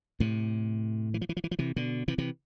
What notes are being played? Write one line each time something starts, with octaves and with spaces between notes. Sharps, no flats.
A2 C3
E3
F3
E3
F3
E3
F3
C3 E3
B2 D3
C3 E3
C3 E3